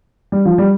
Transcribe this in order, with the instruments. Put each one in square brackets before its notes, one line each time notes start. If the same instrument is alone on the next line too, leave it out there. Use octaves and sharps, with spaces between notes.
[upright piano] G3
F3
G3